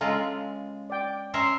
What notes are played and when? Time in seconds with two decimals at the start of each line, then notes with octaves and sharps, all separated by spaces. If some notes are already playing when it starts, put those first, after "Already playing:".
0.01 C#3 G#3 F4 A4 F5 A#5
0.90 D5 G5
1.34 C#4 A#4 E5 C6